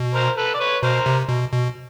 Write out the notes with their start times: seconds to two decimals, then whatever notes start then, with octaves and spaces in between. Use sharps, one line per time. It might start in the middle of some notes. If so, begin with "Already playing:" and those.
Already playing: B2
0.14 A#4 C5
0.37 A4 B4
0.54 D5
0.60 B4 C#5
0.83 B2 A#4 C5
1.06 C3
1.29 B2
1.52 B2